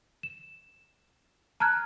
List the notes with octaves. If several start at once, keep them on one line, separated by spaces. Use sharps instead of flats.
E7
A5 A#5 F6 F#6 G#6